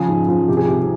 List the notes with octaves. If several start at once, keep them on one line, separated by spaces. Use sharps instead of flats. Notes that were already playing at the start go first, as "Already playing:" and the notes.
Already playing: C#3 F3 G#4
G#2
F3
C2 G4
G#4
C2 G4